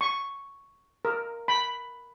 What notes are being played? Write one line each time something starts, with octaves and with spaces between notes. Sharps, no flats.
C#6
A#4
B5